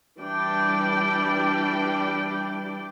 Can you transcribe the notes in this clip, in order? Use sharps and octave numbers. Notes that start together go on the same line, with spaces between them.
E3 G3 D4 D5 G5